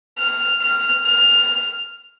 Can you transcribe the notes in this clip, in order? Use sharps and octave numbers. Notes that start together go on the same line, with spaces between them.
F6
F6
F6